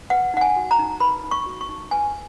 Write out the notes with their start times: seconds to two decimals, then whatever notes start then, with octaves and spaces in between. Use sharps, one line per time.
0.10 B4 F#5
0.34 D#4 F#5
0.41 G#5
0.56 F#4
0.71 A#5
0.79 D#4
1.00 B4 B5
1.24 D#4
1.31 C#6
1.46 F#4
1.61 C#6
1.69 D#4
1.91 B4 G#5